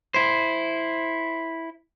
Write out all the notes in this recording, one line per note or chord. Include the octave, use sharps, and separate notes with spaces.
E4 C5